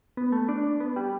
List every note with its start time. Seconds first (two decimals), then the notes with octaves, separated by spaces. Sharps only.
0.17 B3
0.32 A3
0.49 D4
0.80 B3
0.96 G3